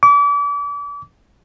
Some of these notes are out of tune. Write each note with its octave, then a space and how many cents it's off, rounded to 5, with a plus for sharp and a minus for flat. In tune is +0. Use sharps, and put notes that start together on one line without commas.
D6 -35